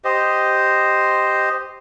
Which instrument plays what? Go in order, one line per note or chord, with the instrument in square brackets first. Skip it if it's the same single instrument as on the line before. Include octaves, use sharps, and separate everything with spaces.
[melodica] G4 C5 D#5